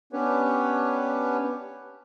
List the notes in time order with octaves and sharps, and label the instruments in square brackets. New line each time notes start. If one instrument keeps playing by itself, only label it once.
[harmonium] B3 C#4 D4 G4 B4 C#5